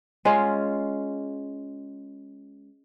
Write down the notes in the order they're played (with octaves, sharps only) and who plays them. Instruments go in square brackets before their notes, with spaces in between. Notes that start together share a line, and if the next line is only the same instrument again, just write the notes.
[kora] G#3 C#4 F4